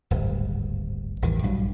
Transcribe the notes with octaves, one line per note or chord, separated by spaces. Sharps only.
D1 G#1 G2
A1 E2 G2 D#3
A#1 G2 F3 F#3